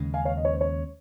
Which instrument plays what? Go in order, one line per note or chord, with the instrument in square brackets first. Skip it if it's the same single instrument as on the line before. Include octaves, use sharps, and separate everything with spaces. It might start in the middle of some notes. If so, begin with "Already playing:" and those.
Already playing: [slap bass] D#2 C#3 G#3 C#4
[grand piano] F5 G#5
C#5 F5
D#5
C#5
C5
C#5